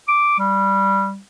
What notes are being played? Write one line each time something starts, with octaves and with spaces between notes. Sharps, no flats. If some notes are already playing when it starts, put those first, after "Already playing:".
D6
G3